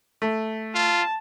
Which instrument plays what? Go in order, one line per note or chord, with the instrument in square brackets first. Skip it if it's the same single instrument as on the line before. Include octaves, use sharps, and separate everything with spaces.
[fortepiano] A3
[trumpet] F4 [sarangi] A5